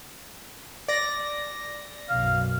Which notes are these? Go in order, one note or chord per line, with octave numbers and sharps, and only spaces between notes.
D5 A#6
B1 F#2 F5